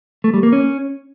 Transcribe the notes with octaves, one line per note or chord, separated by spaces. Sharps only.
A3
G3
A#3
C#4